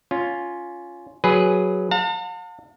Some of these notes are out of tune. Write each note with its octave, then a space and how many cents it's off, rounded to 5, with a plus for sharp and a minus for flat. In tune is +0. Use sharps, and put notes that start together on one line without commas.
C#4 +10 F4 +0
F#3 +0 G#4 +0 B4 +0
F5 +45 A5 +45